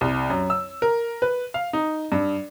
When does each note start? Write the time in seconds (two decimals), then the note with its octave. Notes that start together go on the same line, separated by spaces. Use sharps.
0.01 C2
0.30 F#2
0.50 E6
0.82 A#4
1.22 B4
1.54 F5
1.73 D#4
2.12 G2